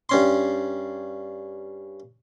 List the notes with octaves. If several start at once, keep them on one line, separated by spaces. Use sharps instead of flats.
G2 C#4 C6